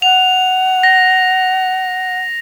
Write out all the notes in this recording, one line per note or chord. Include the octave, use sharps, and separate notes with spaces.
F#5 F7
A#6